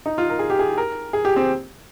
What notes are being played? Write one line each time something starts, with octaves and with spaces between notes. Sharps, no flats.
D#4
F4
A#4
G#4
G4
G#4
A#4
G#4
G4
C4